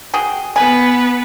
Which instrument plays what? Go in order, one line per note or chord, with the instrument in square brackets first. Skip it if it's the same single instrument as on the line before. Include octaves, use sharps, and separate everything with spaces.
[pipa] F#4 G#4 G5
[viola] B3 B4 [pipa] G#5